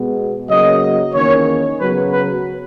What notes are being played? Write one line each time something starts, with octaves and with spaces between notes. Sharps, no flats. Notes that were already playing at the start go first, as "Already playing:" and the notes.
Already playing: B2 G#3 B3
C#3 F#3 A#3 D#5
E2 D#3 A#3 C#4 C#5
C#3 F#3 B3 B4
B4